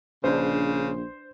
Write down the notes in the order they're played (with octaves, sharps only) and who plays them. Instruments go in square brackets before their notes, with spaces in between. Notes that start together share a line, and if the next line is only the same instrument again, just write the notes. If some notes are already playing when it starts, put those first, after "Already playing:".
[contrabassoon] A#1 [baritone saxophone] C#3 [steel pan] D4 B4 [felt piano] C5